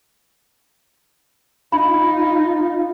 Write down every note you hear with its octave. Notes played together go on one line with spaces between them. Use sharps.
D#4 F4 B5